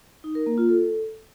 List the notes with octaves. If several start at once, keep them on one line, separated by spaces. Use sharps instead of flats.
D#4
A#4
A#3
F4
A4